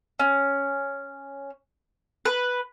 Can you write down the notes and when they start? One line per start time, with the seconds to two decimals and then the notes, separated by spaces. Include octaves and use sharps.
0.19 C#4
2.25 B4